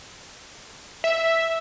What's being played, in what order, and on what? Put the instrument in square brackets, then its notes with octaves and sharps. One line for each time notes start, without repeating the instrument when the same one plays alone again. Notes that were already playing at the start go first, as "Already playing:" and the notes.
[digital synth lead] E5